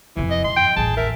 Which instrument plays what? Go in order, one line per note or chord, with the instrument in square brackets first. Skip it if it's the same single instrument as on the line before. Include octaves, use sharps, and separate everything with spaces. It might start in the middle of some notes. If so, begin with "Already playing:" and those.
[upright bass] F2 C3 [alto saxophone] E3
[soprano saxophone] D#5
[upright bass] B1 [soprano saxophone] C6
[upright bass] G1 [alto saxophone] G5
[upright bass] A1 D#2 [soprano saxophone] G#4 [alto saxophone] A5
[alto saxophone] A#4 [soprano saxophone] E5